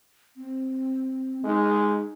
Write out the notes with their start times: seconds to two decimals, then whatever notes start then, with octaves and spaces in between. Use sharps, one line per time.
0.37 C4
1.44 G#3 D#4